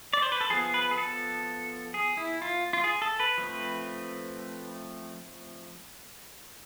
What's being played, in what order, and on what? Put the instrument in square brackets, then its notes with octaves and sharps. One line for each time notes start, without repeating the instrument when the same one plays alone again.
[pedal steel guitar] D5
C5
B4
A4
F3 B3 G#4
B4
G#4
A4
G#4
E4
F4
F4
G#4
A4
B4
F3 A3 C4